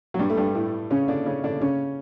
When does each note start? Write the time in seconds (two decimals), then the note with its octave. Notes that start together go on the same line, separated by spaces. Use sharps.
0.14 F#3
0.19 G2 G3
0.30 A3
0.37 G2 G3
0.55 A2 A3
0.91 C#3 C#4
1.08 D3 D4
1.26 C#3 C#4
1.44 D3 D4
1.61 C#3 C#4